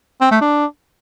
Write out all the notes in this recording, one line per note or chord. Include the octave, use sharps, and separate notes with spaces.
C4
A3
D4